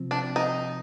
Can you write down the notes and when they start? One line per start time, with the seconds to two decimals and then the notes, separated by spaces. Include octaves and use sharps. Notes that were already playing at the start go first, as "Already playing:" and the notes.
Already playing: C3 F3 C4
0.11 D4
0.36 D#4